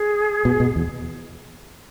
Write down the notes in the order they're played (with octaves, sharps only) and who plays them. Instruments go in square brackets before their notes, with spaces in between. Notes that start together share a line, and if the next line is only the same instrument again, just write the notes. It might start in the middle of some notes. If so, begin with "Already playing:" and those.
Already playing: [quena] G#4
[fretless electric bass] B2
B2
E2